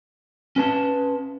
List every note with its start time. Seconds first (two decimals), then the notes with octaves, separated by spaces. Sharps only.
0.56 C#4 B4 A5